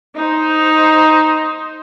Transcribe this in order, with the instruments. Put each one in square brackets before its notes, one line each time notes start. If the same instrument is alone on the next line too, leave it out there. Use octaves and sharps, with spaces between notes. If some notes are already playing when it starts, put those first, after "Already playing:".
[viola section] D#4 C5